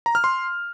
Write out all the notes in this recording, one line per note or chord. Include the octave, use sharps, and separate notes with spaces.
A#5
F6
C6